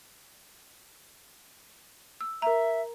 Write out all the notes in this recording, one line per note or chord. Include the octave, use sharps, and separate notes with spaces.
E6
A#4 E5 A#5